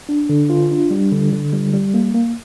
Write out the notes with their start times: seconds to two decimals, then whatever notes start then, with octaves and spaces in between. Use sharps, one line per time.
0.09 D4
0.29 D3
0.50 F4
0.71 D4
0.91 G3
1.12 D3
1.32 D3
1.53 G3
1.73 G3
1.94 A#3
2.14 A#3